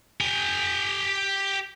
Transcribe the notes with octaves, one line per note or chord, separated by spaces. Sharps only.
G4 G#5